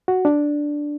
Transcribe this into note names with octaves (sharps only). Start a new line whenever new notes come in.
F#4
D4